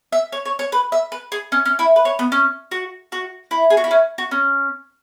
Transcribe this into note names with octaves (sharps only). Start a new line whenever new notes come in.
E5
C#5
C#5
C#5
B4
E5
B4
G#4
C#4
C#4
E4
B4
C#5
B3
C#4
F#4
F#4
E4
G#4
F#4
E4
C#4
F#4
C#4